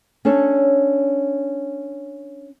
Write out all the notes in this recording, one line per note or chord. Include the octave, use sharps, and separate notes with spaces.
C#4 D4 A4 C#5